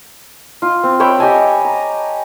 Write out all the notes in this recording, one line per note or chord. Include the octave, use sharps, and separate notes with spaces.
F4
C4
C#5 E5 G5 B5
G4 D#5 G#5 A5
A#5